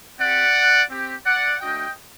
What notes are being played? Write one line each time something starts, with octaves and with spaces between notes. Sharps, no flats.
C4 G4 D5 F#5
C4 G4
D5 F#5
A3 D4 F#4 D#5 G5